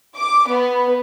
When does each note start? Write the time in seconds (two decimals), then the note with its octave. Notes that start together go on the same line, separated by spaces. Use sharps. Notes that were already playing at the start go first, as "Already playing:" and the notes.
0.16 D6
0.48 B3